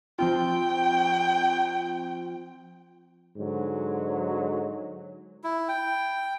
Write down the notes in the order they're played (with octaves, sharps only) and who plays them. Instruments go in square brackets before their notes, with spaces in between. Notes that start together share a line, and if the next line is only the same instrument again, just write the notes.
[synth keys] F3 C4 F4 [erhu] G5
[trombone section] G#2 D3 F#3
[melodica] E4
G5